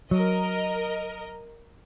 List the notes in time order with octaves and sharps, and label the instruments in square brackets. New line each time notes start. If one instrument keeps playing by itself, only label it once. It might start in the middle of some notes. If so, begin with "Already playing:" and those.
[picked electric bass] F#3 [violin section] A#4 D#5